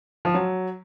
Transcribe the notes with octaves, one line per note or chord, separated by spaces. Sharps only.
F3
F#3